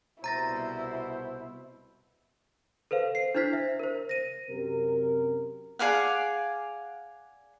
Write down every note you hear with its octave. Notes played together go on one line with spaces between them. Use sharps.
C2 B2 E4 C5 A#5 A6 A#6
A4 B4 C5 F5
C7
D4 E4 C5 F6 G#6 B6
E5
A#4 C5
A#6 D#7
F#2 C3 C4 A#4
G#4 D5 F5 F#5